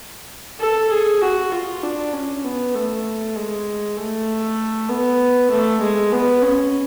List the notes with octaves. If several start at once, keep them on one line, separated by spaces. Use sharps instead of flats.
A4
G#4
F#4
F4
D4
C#4
B3
A3
G#3
A3
B3
A3
G#3
B3
C#4